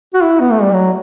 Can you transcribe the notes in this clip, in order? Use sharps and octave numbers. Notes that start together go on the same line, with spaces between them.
F#4
E4
B3
A3
G3
F#3